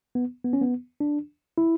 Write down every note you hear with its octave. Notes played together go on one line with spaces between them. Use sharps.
B3
B3
C#4
B3
D4
E4